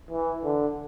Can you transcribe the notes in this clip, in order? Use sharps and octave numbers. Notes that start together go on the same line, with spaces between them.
E3
D3